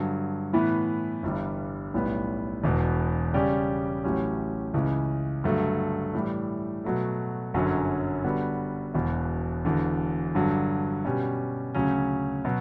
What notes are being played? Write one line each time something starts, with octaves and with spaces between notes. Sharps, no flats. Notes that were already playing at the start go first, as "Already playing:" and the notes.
Already playing: G2 D3 F#3
A2 E3 B3
G1 G2 E3 G3
B1 A2 G3 B3
E1 E2 B2
C#3 G3 C#4 G4 D5
A1 A2 F#3 C#4 G4
C#2 C#3 E3
G2 D3 F#3 A3
A2 E3 G3
B2 F#3 A3
G1 F#2 D3 F#3 C#4
D3 G3 B3 F#4
E1 E2 B2
E1 E2 D3
G2 D3 F#3
B2 G3 C#4 G4
D2 C#3 F#3 C#4
B2 F#3